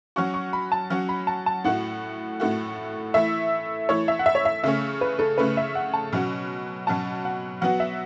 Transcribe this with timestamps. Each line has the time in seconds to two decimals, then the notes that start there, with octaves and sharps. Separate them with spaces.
0.16 F#3 C#4 F#4 C#6
0.34 C#6
0.53 B5
0.72 A5
0.90 F#3 C#4 F#4
1.09 B5
1.27 A5
1.46 A5
1.64 A2 A3 F#4 F#5
2.40 A2 A3 F#4
3.14 E3 A3 E4 E5
3.89 E3 A3 E4 C#5
4.08 E5
4.19 F#5
4.26 E5
4.35 C#5
4.45 E5
4.63 C#3 A3 C#4 E5
5.01 B4
5.19 A4
5.38 C#3 A3 C#4 B4
5.57 E5
5.75 F#5
5.94 A5
6.12 B2 F#3 C#4 F#4
6.87 B2 F#3 C#4 F#4 A5
7.25 F#5
7.61 F#3 B3 F#4 F#5
7.80 E5